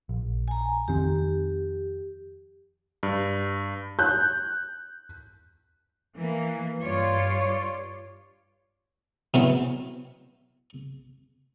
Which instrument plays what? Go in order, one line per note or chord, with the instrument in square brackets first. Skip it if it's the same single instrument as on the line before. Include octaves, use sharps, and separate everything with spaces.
[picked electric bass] A#1
[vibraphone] G#5 A#5
[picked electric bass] F2 D#3 C4 [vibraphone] G4
[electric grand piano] G2
[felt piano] F#6 G6
[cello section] E3 A#3
G2 G3 F4 C#5 D5
[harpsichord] B2 E3 F#3 B3